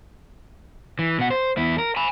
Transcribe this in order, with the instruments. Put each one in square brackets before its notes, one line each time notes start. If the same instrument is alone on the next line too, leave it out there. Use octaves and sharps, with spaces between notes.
[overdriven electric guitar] E3
B2 F#5
C5
E2 E4
A#4
G#5 B5